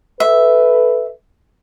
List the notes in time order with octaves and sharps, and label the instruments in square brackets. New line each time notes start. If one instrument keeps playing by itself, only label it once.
[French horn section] A4 B4 [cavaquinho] E5